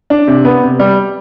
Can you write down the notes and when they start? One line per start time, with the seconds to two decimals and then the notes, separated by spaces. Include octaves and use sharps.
0.10 D4
0.27 C3
0.45 B3
0.63 C3
0.80 G3